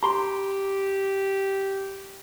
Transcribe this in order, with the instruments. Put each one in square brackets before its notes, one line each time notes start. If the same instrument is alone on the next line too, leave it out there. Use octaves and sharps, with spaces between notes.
[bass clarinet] G4 [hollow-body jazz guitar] A#5 C6